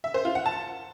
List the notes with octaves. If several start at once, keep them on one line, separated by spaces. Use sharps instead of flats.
E5
C5
F4
F#5
A5